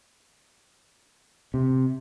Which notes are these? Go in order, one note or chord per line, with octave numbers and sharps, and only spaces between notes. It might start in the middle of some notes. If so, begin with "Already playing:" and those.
C3